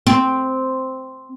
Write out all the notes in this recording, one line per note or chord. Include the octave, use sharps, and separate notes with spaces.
C4